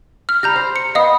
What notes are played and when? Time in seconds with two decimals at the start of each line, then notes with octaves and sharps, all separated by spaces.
0.29 F6
0.43 G3 G4 A#5 G6 A#6
0.56 C5
0.76 C#7
0.95 B3 D#5 F5 D#6